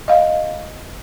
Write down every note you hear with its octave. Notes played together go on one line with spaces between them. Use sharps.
D#5 F5